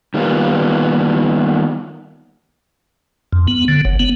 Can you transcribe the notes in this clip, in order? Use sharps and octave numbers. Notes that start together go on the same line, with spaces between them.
D#3 G3 A#3 B3 F4
F2
B3
D3
F#1
B3